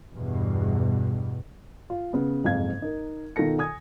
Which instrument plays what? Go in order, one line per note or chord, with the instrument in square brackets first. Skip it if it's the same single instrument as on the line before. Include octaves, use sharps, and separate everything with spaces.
[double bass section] E2 G2 B2
[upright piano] F4
C#3 B3
F#1 F2 G#2 F5 G#6
D#4 A#4
B2 D#3 F4 A4 A#6 C#7
G#5 D#6 G#6